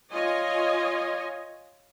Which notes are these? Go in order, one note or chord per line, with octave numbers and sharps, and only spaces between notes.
F4 C#5 D#5 G#5